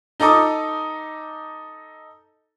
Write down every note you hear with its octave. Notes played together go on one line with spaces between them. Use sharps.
D#4 A4 A#5 D6 D#6